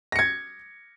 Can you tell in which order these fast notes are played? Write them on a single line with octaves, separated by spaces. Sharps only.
A#6 C#7 G#6